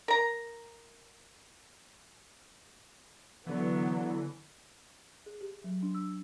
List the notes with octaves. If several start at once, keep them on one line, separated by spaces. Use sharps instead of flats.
A#4 A#5
D3 E3 F#3 B3
G#4
G4
F#3
D4
E6